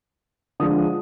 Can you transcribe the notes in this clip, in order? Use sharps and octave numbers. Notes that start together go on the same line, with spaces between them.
D3 F3 G#3 D4 D#6